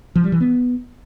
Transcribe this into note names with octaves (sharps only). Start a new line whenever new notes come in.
F3
G3
E3
B3